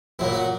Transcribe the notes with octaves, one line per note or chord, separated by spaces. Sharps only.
A#2 F#3 A#3 E4
F#4